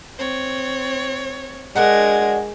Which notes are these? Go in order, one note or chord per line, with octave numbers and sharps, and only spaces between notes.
C4 C#5
G#3 D4 F#4 A#4 F#5 G#6